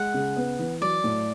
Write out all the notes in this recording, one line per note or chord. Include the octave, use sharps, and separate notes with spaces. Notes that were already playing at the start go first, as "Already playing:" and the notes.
Already playing: G#3 F#5
C#3
B3
E3
F#3 D5
A2